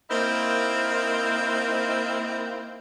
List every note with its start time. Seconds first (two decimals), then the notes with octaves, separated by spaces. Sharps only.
0.10 A#3 C4 D#4 E4 A#4 C5